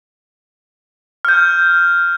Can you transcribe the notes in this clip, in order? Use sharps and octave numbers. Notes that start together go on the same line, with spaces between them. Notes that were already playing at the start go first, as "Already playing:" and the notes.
F6 G6